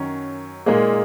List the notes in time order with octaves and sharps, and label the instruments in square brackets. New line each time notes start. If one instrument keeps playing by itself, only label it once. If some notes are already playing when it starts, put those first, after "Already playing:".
Already playing: [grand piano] F#2 D#3 F#3 [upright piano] C#4
[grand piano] A#2 G#3 D#4 G#4 [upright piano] A#3